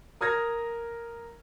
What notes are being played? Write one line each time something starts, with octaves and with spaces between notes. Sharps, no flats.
A#4 D#6 F6 G#6 A#6